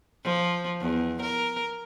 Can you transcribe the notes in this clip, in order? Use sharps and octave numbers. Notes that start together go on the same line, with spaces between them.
F3
E2
A#4